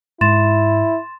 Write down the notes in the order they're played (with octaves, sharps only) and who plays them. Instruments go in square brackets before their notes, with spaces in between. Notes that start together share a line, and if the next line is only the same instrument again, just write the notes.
[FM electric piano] G#2 [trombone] E4 [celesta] C6 A6 E7